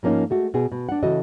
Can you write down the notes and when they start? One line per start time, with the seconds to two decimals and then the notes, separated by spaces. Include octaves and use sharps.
0.03 G#2 F3 A#3 C#4 D#4
0.30 G#3 A3 F#4
0.54 B2 B3 G#4
0.72 B2
0.89 D4 F#5
1.03 C#3 E3 F#4 A4 D#5